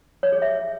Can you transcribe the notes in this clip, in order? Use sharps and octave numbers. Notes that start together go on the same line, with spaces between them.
C#5
G#4
E5